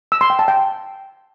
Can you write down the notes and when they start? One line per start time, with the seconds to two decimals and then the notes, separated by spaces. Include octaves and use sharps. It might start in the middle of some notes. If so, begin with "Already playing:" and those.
0.12 E6
0.21 C6
0.30 G5
0.39 A5
0.48 G5